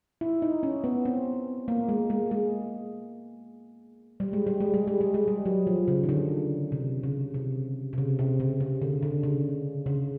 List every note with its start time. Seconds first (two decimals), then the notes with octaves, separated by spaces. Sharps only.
0.21 E4
0.42 D#4
0.63 C#4
0.84 B3
1.05 C4
1.68 A#3
1.89 G#3
2.10 G#3
2.31 G#3
4.20 G3
4.33 G#3
4.47 G3
4.60 G#3
4.74 G3
4.87 G#3
5.01 G3
5.14 G#3
5.28 G3
5.46 F#3
5.67 F3
5.88 C#3
6.03 D#3
6.09 D3
6.72 C3
7.03 C#3
7.34 C3
7.93 C3
7.98 C#3
8.19 C3
8.40 C#3
8.60 C#3
8.82 D3
9.03 D3
9.23 C#3
9.86 C#3